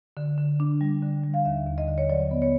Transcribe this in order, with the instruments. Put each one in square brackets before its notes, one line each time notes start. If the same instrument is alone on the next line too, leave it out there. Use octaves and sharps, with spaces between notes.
[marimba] D3
D3
D4
G3
D3
G3
F5
D#2 E5
D#2
D#5
D3
C#5
F#3 D5
B3
C#5